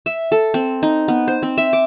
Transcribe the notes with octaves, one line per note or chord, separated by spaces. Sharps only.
E5
A4
C4
D#4
B3
C5
C4
E5
D6